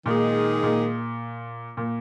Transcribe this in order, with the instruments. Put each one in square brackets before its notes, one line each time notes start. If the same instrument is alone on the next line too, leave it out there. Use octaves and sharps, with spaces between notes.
[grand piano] A#2 [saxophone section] D#3 G#3 D#4 G#4
[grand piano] A#2
A#2